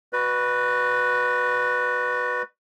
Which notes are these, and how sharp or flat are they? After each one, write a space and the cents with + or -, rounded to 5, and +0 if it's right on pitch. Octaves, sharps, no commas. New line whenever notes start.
F#4 +0 B4 +0 D5 +45